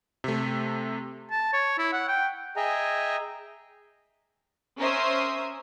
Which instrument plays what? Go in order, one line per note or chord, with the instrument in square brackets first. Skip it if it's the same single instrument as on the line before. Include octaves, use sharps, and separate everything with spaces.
[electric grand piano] C3 A3
[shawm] A5
C#5
E4
F#5
G5
[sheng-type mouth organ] G#4 D#5 E5 G5 G#5 A#5
[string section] C#4 A#4 C5 E5 D#6